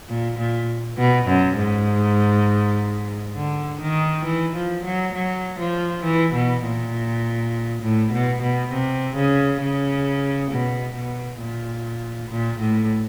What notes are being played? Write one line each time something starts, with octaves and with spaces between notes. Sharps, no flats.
A#2
A#2
B2
F#2
G#2
D3
D#3
E3
F3
F#3
F#3
F3
E3
B2
A#2
A2
B2
B2
C3
C#3
C#3
B2
B2
A#2
A#2
A2